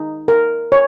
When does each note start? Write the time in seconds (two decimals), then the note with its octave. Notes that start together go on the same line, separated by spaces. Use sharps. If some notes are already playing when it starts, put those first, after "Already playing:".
Already playing: D#4
0.28 A#4
0.72 C#5